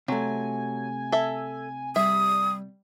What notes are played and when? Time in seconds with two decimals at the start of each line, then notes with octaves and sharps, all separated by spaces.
0.08 C3 F#3 A3 G#5
1.12 A4 E5
1.96 G3 E5 D#6